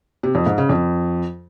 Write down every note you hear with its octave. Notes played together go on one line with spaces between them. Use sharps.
C3
F2
G#2
C#3
F2